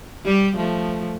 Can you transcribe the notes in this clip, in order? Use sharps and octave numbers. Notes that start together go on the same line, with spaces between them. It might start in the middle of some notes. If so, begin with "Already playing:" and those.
G3 G4
F3 A3